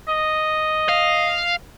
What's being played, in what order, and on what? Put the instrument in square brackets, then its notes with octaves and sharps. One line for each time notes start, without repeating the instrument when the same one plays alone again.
[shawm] D#5
[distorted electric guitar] F5